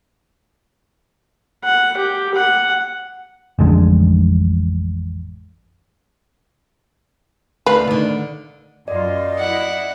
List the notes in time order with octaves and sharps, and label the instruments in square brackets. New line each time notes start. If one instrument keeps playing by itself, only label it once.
[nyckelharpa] F#5
G4
F#5
[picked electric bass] A1 F2 D3 G#3
[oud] D2 F5 [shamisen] B4
[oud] D3 D#3
[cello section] F#2 F4 [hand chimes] D5 [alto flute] D#5
[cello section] E4 [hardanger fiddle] F#5